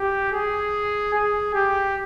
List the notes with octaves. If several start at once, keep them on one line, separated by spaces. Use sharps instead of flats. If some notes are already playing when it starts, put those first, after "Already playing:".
Already playing: G4
G#4
G#4
G4